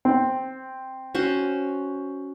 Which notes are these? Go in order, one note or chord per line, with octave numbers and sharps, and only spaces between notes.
C4
C#4 F#4 C5